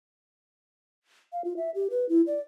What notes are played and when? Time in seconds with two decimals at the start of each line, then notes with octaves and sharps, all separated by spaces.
1.33 F5
1.44 F4
1.57 E5
1.75 G4
1.90 B4
2.09 E4
2.27 D5